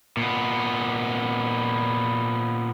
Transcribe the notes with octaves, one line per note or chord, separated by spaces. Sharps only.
A#2 B3